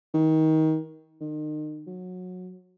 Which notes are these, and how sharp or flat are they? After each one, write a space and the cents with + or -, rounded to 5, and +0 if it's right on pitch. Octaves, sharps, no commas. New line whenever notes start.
D#3 +25
D#3 -35
F#3 -20